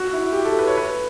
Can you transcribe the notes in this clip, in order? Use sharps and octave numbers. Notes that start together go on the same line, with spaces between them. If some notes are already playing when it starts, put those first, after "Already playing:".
Already playing: F#4
E4
G4
A4
B4
C#5
B4